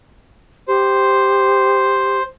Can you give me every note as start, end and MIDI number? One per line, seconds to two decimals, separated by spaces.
0.68 2.19 67
0.68 2.23 72